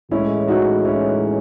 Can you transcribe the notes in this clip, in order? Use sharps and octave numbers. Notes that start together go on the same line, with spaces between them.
A2 E3 G#3 C#4 E4
D#4 F#4
C#4 E4